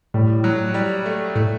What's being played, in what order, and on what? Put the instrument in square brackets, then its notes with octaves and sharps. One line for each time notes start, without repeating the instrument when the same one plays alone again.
[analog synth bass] A2 [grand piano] G3
[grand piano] F#3
G3
A3
[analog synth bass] A2 [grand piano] A3